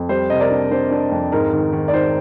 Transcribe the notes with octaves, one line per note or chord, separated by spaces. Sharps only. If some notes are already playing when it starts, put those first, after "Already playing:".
Already playing: F2
G3 C5
C3 D#5
A#4 D5
D4
D4 C5
D4
F2
G#2 A#4
D#3
D#3
D5
G#2 C5